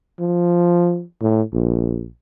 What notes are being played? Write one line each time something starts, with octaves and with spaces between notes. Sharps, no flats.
F3
A2
A#1